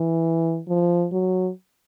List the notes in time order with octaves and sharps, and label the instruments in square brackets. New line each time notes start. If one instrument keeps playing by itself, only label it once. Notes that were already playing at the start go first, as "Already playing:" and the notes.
Already playing: [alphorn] E3
F3
F#3